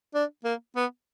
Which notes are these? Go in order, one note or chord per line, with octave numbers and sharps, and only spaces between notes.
D4
A#3
B3